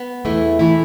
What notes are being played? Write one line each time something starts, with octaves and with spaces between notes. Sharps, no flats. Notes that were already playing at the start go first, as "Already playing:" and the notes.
Already playing: B3
E2 E3 A3 E4
E3 A3 E4